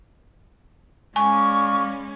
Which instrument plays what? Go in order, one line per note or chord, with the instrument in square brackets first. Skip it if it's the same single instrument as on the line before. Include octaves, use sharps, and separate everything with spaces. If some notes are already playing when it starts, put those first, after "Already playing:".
[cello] G#3 C#4 [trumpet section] D5 F5 B5 [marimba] G#5 [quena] C#6